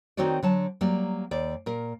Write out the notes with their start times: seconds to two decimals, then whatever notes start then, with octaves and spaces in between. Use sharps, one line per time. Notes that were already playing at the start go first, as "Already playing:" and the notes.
0.17 D#3 C4 D#4 F#4 C#5 D5
0.43 D3 F#3 A5
0.81 F#3 G3 A#3 D5
1.31 D#2 D5
1.66 A#2 A#4